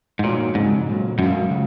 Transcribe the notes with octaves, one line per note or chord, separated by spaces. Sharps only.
G#2
A#2 A#3 D#4 F#4 A#4 C#5
F2 G#2 C#3 G#3 C4
A#2 F#3 A#3
F#2 G#3 C#4 F#4 A#4 F5
C#3 G#3